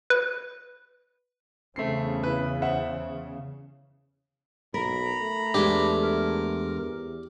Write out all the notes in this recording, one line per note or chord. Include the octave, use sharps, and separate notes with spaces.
B4
E2 C#3 A3 C4 C7
E4 B4
C5 E5 F#5
B1 A#4 A#5 B5
A3
E2 G#3 D4 G4
A#4
E2